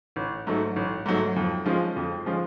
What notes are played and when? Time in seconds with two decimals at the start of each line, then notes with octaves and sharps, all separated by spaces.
0.16 A1
0.47 G#2 F#3 A3
0.76 A1
1.06 G#2 F#3 A3
1.36 F2
1.66 F3 G#3 C#4 F4
1.96 F2
2.26 F3 G#3 C#4 F4